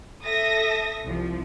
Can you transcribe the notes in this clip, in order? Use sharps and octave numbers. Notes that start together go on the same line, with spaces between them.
A4 E5 D#6 A#6
C2 F3